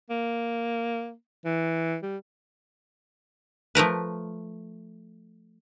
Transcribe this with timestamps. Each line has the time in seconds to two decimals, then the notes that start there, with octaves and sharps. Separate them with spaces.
0.10 A#3
1.45 E3
2.03 G3
3.75 F3 A3 A#4 B4